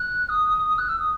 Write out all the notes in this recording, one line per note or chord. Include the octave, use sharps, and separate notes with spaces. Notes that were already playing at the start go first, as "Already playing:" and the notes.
Already playing: F#6
D#6
F#6
E6
D#6